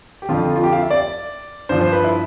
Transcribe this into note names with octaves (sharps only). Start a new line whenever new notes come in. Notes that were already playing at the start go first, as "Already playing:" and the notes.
G4
F2 D3 F3 F4
F4
G4
F5
E5
D5
G2 F3 C5
C5
B4
E4